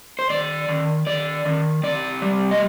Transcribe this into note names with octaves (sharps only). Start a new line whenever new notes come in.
C5
D#3 D5
D#3
D#3 D5
D#3
C3 D5
G3
D#5